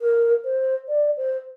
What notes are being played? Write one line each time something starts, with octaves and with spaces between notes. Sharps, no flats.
A#4
C5
D5
C5